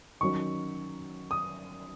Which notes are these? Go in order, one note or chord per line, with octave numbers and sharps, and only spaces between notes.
D#3 F#3 C#4 C#6
D#6